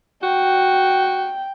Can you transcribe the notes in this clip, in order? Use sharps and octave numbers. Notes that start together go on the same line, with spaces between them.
F#4 G5